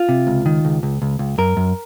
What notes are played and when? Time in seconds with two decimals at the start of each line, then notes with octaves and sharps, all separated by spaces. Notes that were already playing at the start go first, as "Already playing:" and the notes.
Already playing: F4
0.09 C3
0.27 C#2
0.46 D#3
0.65 C#2
0.83 C#2
1.02 C#2
1.19 C#2
1.38 F#2 A#4
1.57 F#2